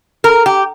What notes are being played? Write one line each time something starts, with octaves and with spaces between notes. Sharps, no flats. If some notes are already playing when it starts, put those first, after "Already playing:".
A#4
G4